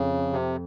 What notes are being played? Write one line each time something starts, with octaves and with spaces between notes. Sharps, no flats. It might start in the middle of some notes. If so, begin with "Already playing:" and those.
Already playing: F2 C#3
C3